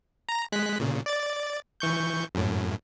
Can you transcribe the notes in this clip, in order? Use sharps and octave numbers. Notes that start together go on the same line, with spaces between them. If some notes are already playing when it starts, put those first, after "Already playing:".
A#5
G#3 F#6 B6
A#2 C#3
D5 A6
E3 C#6 G6
F#2 A2